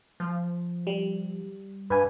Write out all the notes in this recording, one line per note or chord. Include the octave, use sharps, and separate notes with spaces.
F3
G3
G2 B4 G#5